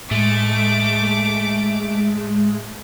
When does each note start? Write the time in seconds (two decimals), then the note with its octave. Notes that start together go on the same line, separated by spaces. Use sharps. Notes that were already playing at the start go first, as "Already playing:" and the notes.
0.11 A2 G#3 A3 D6